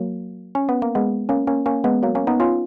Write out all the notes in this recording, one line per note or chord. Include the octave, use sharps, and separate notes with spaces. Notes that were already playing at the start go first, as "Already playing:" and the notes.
Already playing: F#3 A#3
C#4
B3
A#3
G#3 B3
A#3 C#4
A#3 C#4
A#3 C#4
G#3 B3
F#3 A#3
A#3 C#4
B3 D#4
C#4 F4